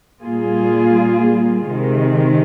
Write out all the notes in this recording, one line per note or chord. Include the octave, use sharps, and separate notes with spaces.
A#2 G3 A#3 F4 G#4
C3 D#3 G#3